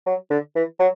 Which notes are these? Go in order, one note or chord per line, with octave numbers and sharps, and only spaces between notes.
F#3
D3
E3
F#3